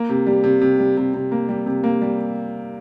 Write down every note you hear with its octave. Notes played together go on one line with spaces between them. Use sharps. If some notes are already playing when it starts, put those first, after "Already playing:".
Already playing: A#3
C3
G3
C3
C3
G3
C3
C3
A#3
G3
C3
A#3
G3